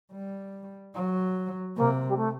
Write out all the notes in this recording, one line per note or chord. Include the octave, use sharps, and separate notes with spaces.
G3
F#3
C3 A#3
G3
A3